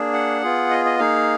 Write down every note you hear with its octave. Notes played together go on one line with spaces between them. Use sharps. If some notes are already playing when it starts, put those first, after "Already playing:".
Already playing: A#3 D4 G#4
F#5
B3 F4 G#4
D#5
D#5
A#3 D#4 G#4 F5